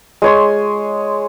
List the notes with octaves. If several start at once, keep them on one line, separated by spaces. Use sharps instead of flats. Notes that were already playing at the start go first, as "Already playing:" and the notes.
G#3 C#5 C6